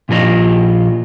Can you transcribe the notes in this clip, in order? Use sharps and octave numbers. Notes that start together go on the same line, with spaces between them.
A#2 F3 F4 A#4 D#5